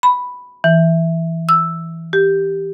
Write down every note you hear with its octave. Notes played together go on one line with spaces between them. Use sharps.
B5
E3
E6
G4